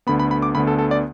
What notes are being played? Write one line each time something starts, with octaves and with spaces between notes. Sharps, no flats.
D2 D3 B3 B5
B5
B5
D6
D2 D3 B3 B5
A4
A4
D5